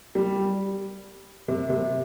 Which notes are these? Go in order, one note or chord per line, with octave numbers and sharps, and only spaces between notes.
G3
C3
C3